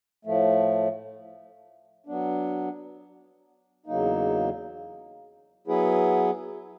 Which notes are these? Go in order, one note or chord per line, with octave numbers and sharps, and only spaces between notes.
A2 F3 A3
F#3 B3 D4
E2 C#3 F#3 A#3 D#4
F#3 B3 E4 G#4 B4